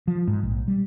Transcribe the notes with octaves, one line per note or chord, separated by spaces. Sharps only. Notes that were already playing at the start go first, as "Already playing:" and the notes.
F3
G#2
A#1
G3